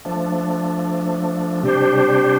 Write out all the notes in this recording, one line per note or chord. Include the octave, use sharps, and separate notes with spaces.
F3 A3 D4
C3 G3 D4 G4 C5